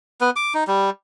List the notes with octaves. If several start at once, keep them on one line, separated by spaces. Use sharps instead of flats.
B3
D6
D#4
G3